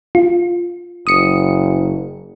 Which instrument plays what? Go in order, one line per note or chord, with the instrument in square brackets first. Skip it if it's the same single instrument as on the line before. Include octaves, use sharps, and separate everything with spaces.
[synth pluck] F4
[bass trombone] F#1 [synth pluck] D#6 C#7